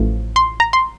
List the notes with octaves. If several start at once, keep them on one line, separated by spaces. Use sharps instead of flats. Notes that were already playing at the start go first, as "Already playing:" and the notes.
Already playing: A1 A2 F3
C6
A#5
C6